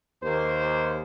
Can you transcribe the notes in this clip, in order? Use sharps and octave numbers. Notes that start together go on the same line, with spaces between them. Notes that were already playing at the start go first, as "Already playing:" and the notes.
D#2 A#3 C5